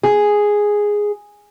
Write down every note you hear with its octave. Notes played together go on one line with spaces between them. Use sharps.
G#4